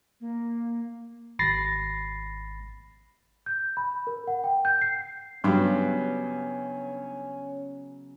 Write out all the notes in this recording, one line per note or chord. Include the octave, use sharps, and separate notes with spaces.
A#3
G#1 B5 A6 A#6 C7
G6
B5
A#4
F#5
G5
G6
C7
G2 C#3 F#3 B3 C#4